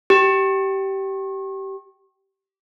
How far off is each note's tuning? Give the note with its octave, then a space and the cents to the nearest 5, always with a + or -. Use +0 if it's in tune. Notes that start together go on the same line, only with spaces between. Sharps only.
G4 -20